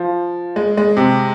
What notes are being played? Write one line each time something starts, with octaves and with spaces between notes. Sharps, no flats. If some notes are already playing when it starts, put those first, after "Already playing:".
Already playing: F3
G#3
G#3
C3